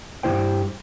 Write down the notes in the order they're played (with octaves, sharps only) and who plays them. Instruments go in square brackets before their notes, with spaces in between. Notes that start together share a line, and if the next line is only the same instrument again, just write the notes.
[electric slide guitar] G2 G3 G#3 E4 C5 G5